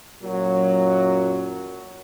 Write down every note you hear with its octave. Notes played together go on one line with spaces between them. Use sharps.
F#2 A#2 F#3